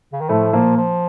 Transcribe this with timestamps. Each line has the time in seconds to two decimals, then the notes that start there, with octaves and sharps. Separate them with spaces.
0.13 C#3
0.21 D#3
0.29 A2 F3 A3
0.53 A#2 F3 A#3
0.77 F3